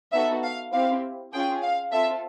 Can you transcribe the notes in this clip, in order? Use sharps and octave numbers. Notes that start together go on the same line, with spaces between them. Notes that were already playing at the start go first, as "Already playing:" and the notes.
B3 D#4 F#4 A4 E5
F5
C4 E4 G4 F5
C#4 F4 G#4 G5
F5
C4 F4 A4 E5